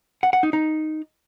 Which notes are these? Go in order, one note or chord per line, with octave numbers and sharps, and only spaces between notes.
F#5
F#5
D#4
D#4